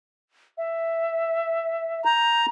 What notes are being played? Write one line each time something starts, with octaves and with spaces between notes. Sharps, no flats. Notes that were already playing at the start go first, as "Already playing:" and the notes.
E5
A#5 G6